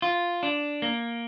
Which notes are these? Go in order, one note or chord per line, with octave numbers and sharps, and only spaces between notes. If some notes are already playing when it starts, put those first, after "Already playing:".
F4
D4
A#3